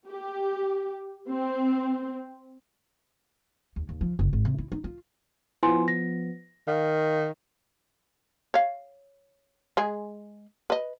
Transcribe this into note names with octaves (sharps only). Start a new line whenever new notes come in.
G4
C4
D#2
D#2
F3
F#1
G#1
C3
E4
D#4
F4
F3 B3 E4 G#5 C6
A#6
D#3 F5
C#5 F5
G#3 G#4
B4 D#5